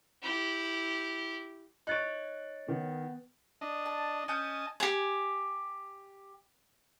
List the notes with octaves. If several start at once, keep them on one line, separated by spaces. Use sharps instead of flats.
E4 G4
D#4 C#5 F#6 A6 D7
D#3 B3
D4 D#5
A5
C#4 D#5 G#5 A5 D#6 G6
G4 G#5